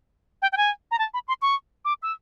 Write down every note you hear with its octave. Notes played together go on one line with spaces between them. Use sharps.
G5
G5
G#5
A#5
A5
B5
C6
C#6
D6
E6